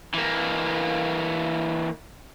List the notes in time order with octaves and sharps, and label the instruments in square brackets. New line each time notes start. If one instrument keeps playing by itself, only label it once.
[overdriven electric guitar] E3 A#3